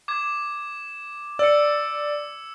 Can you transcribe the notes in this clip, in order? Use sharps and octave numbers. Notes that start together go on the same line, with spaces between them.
D6 G#6
D5 E6 C#7